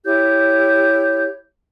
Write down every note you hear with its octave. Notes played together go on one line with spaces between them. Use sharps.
E4 G4 C#5 G6